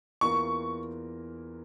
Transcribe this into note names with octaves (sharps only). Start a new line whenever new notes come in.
E2 E3 A#3 F4 A#4 C#6